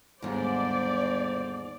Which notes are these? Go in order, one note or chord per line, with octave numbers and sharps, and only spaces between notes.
G1 D#2 G#2 C5 D5